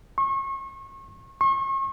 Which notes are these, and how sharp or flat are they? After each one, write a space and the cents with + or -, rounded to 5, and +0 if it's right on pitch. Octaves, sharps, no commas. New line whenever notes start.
C#6 -35
C#6 -40